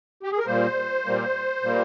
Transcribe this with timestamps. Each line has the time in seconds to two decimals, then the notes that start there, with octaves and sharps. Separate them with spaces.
0.23 G4
0.31 G#4
0.39 A#4
0.46 A#2 G3 A#3 C5
1.05 A#2 G3 A#3
1.63 A#2 G3 A#3